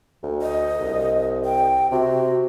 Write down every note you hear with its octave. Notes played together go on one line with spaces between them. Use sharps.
D2
D#5
C2
G5
C3 F#4